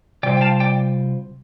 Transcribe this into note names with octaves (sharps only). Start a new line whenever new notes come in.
C3 G3 F4 C5 D5 G5
G5
F5 A5
D5 G5